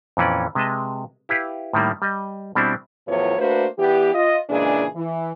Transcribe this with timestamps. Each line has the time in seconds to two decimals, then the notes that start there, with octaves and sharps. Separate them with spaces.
0.17 F2 A#2 E3 C#4 D5
0.55 C3 G#3 B4 D#5 A5
1.29 E4 G4 B4 F5
1.73 A2 D#3 G3 A#3
2.02 G3 D#5
2.55 B2 G3 C4 D4 E4
3.08 E2 A2 F3 F#3 B4 C#5
3.38 A3 A#3 D4 F#4 B4 C5
3.78 E3 G3 B3 G4
4.14 F4 D#5
4.49 A#2 C#3 E3 G#3 D4 G#4
4.96 E3